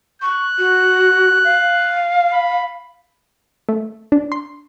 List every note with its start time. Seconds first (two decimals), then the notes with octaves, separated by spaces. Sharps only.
0.22 C#6 F#6
0.58 F#4
1.45 F5
2.33 B5
3.69 A3
4.12 D4
4.32 C6